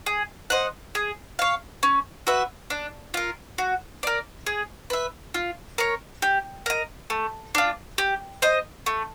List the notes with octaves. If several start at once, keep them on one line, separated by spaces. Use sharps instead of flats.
G#4
C5 D#5 F#5
G#4
C#5 F5
C#4
F#4 B4 E5
D4
F4 A#4
F#4
A#4 D5
G#4
B4 E5
F4
A#4 C#5
G4
A#4 D#5
A3
D4 F4
G4
C5 D#5
A3